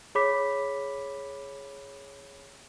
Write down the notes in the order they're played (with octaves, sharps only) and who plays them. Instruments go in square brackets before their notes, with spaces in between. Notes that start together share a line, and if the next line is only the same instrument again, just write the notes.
[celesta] G#4 C#5 B5 D6 B6